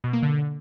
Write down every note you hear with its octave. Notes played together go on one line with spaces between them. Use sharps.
B2
A#3
D3